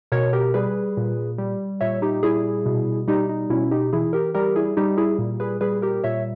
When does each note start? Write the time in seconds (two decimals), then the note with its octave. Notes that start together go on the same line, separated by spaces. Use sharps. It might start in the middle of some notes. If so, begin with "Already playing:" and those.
0.12 B2 A#4 C#5
0.33 G4 A#4
0.54 G3 G#4 B4
0.97 A#2
1.38 G3
1.81 A#2 C#5 E5
2.02 D#4 G4
2.23 G3 E4 G#4
2.66 B2
3.08 G3 D#4 G4
3.29 D#4
3.50 B2 C#4 E4
3.71 D#4 G4
3.93 E3 E4 G#4
4.13 G4 A#4
4.34 G3 G4 A#4
4.56 E4 G#4
4.77 G3 D#4 G4
4.97 E4 G#4
5.19 A#2
5.40 G#4 B4
5.61 G3 G#4 B4
5.82 G4 A#4
6.04 A#2 C#5 E5